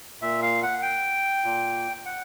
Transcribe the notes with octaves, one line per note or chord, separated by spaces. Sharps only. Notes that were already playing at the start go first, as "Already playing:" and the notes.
A#2 E5
F5
F#5
G5
A#2
F#5